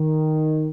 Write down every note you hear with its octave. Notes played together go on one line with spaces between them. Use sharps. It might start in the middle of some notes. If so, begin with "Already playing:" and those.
Already playing: D#3